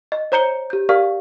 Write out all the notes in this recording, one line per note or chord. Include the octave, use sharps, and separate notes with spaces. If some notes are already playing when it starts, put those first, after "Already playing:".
D#5
C5 C#5 A#5 G6 C#7 G7
G4 G6
G4 A#4 D5 F5 C#6 F6